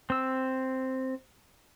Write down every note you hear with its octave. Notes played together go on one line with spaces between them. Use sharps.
C4 E6